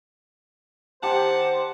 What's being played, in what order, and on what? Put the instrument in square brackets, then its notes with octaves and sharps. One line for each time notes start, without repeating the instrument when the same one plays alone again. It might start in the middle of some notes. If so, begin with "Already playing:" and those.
[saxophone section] D#3 F#5 [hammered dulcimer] G4 [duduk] C5 [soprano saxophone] A5